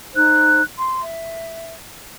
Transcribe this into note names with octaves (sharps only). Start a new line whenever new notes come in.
D#4 C5 F#6
C6
E5